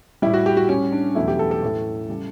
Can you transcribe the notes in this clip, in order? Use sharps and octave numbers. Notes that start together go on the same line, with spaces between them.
A2 G3 E4
F#4
G4
F#4
A2 G3 C#4
D4
E2 B2 F#3 A3 E4
G4
A4
A4
A2 E3 A3
C#3 G3